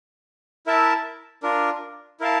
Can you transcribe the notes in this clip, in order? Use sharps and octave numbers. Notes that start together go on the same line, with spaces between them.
E4 A#4 E5 A5
D4 F4 A#4
E4 A#4 F5 A5